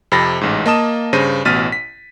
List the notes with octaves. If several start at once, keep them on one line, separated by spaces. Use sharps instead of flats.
F2 C3 B5 A6 A#6
A1 G#2
A#3 D#5 A5 D#6 E7
G2 C#3 C5 A#6 D#7
A1 B2 F6 A6 B6 D#7
B6